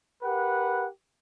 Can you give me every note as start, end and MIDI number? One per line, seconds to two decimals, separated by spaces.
0.23 0.86 67
0.23 0.86 70
0.23 0.86 71
0.23 0.86 78